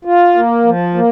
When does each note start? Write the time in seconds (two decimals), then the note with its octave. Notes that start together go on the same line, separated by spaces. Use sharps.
0.05 F4
0.35 A#3
0.64 F3
0.94 A#3